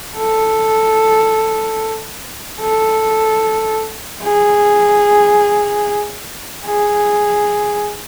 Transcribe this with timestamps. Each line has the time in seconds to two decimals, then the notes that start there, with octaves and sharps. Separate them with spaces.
0.18 A4
2.61 A4
4.23 G#4
6.65 G#4